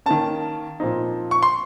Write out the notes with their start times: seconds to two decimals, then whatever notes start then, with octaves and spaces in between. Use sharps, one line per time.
0.06 D#3 A#3 C#4 A5
0.80 A#2 F3 C4 D#4
1.31 C#6
1.43 C6